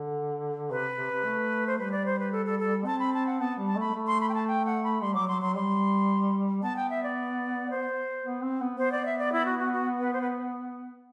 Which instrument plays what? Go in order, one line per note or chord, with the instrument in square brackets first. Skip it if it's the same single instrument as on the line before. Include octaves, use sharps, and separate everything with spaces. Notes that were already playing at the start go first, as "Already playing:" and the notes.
Already playing: [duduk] D3
[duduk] C3 [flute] B4
[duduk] C3
C3
A3
[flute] C5
[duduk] G3 [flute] B4
[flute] D5
C5
B4
A4
A4
A4
[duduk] C4 [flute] A5
[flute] B5
A5
F#5
[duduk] B3 [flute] A5
[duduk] G3
[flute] A5
[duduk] A3 [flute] B5
[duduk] A3
[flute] C6
B5
G5
A5
G5
F#5
B5
[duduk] G3 [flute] C6
[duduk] F#3 [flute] D6
[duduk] F#3 [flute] C6
[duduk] F#3 [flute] C6
[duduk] G3 [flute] C6
[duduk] B3 [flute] A5
[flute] G5
E5
D5
C5
[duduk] B3
C4
B3
[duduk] B3 [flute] C5
[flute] D5
E5
D5
E4
F#4
F#4
F#4
B4
C5
B4